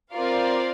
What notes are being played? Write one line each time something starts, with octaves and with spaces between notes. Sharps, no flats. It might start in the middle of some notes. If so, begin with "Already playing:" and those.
C4 F4 A#4 D5 F5